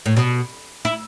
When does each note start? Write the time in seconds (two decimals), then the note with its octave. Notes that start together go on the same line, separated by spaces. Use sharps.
0.06 A2
0.17 B2
0.85 E4